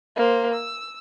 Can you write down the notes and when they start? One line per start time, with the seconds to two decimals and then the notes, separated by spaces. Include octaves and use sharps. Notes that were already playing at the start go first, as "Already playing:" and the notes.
0.16 A#3 C5
0.53 E6